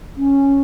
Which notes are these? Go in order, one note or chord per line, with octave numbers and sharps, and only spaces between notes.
C#4